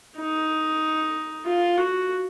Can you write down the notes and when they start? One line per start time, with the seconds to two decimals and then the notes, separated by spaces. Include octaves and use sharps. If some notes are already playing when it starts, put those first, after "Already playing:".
0.17 D#4
1.45 F4
1.77 F#4